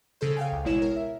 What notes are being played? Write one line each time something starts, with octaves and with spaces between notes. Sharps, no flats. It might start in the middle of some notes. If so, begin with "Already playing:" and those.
C#3 A4 C5
F5 G5 G#5
C#2
A1 B2 G#3 E4 C#5 E7
A#4
E5